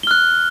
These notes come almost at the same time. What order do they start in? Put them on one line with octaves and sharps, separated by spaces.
G7 F6 F#6